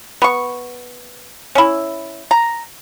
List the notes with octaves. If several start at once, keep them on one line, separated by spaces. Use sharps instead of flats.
B3 C#6
C#4 E4
A#5